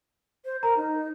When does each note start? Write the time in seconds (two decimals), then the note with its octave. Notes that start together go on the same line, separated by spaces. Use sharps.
0.45 C5
0.63 A#4 A#5
0.77 D#4